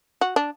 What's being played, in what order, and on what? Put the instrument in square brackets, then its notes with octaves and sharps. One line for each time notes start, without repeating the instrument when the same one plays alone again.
[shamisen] F#4
D4